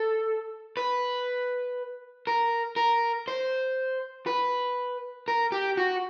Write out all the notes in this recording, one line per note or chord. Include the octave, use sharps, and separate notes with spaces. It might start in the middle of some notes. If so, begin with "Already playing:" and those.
Already playing: A4
B4
A#4
A#4
C5
B4
A#4
G4
F#4